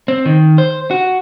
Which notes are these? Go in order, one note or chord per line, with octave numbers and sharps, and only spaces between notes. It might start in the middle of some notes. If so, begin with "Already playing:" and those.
C4
D#3
C5
F#4